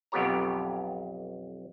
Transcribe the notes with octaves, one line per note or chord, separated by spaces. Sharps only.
B1 F2 B3 G4 C#5 A#5